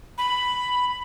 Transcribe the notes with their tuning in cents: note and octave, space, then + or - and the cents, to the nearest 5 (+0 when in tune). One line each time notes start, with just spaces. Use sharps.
B5 +5